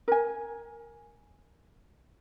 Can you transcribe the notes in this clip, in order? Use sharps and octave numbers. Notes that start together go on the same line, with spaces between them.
A#4 G#5